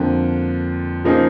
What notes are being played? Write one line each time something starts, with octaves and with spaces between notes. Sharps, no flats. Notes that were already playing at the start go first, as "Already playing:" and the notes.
Already playing: F2 D3 F3 A#3
C#3 F3 A#3 D#4 G#4